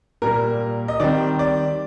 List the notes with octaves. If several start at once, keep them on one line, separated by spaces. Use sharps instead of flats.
A#2 G3 A#3 A#4
D#5
D#3 G3 C4 D5
D5